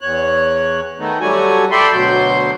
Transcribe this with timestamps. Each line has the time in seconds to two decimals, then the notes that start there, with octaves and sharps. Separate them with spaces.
0.01 E2 C#5 F#6
0.99 D#3 A3 B3 D#4
1.21 F#3 G3 A3 F#4 G#5
1.72 A4 D5 E5 G5 B5 C6
1.92 D2 B2 F#3 F#4 C6 G6